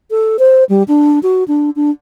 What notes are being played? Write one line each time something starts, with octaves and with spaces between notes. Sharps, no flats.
A4
C5
G3
D4
F#4
D4
D4